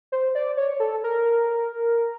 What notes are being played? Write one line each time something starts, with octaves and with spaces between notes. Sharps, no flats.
C5
D5
C#5
A4
A#4